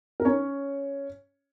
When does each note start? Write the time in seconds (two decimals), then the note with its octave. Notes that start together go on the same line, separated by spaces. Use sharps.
0.20 A#4
0.25 C#4 C#5